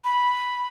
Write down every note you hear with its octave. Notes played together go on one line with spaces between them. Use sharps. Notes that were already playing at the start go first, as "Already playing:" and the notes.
B5